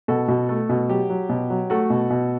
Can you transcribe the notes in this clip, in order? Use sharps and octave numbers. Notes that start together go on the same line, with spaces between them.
B2 F#4 A4
B2
A3
B2
F#3 G4
F#3
B2
F#3
A3 F#4 A4
B2
B2